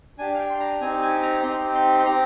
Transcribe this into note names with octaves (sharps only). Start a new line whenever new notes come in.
D4 G4 G#5
F5
G5
C6
A#5
C4 D#4 G4 G#5
G#5
A#5
C4 D#4 G4 C6
C6
C6
C4 G4 A#5